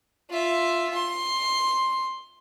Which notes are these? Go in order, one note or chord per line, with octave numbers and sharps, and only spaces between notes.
F4 E5
C6